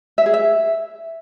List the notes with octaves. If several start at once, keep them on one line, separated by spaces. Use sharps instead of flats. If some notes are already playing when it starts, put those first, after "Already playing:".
E5
G#4
E5